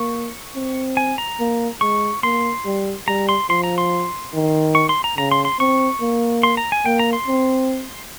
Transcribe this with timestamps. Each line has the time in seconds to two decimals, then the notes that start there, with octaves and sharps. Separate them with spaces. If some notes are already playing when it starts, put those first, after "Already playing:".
Already playing: A#3 C#6
0.55 C4
0.97 G#5
1.18 A#5
1.39 A#3
1.81 G#3 C#6
2.23 A#3 C6
2.66 G3
3.07 G3 A#5
3.29 C6
3.49 F3 C6
3.63 A#5
3.78 C6
4.34 D#3
4.75 C#6
4.89 C6
5.04 A#5
5.17 C#3 A#5
5.31 C6
5.45 C6
5.59 C4 C#6
6.01 A#3
6.43 C6
6.57 A#5
6.72 G#5
6.86 A#3 G5
6.99 A#5
7.13 C6
7.27 C4